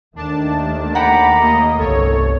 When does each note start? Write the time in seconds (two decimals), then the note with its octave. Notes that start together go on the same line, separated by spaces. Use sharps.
0.16 D#2 D#3 A3 D4 A5
0.95 F#5 G5 A#5 B5 D6
1.40 A#3 D#5
1.79 G1 C2 A4 C#5